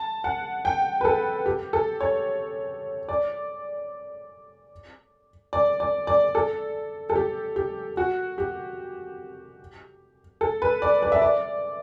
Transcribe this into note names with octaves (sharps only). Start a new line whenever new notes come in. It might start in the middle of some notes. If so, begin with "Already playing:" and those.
Already playing: A5
F#5
G5
B4
A4
G4
A4
C#5
D5
D5
D5
D5
A4
A4
G4
G4
F#4
G4
A4
B4
D5
D5
E5
D5